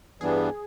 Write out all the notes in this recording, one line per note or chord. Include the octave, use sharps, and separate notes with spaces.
G2 E3 G3 B3 D4 G#4